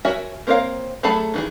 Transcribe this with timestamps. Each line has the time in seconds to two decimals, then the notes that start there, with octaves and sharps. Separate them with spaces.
0.05 F#4 A#4 C#5 E5 G#5
0.47 A#3 C4 A#4 C#5 F5
1.03 F#3 A3 G#4 A5 B5
1.34 D#3 E3 G#4